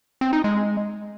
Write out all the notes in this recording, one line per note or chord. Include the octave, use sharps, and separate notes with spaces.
C4
D#4
G#3